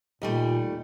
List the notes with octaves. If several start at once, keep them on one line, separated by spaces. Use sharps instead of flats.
D#2 A#2 G3 A3